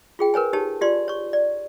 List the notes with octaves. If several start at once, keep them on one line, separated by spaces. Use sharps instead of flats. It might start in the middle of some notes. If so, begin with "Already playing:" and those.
F4 G#4 G5
A#4 B4 C#5 G#5
D#4 G4 C#5 A5
F4 G4 D5 C6
C#5 C#6
D5